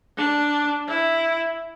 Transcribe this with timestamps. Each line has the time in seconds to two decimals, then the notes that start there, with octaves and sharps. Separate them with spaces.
0.18 D4
0.88 E4